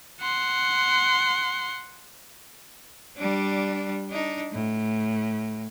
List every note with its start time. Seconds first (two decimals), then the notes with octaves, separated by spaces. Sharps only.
0.20 F#5 C6
3.17 G3 D4
4.10 D4 D#4
4.52 A2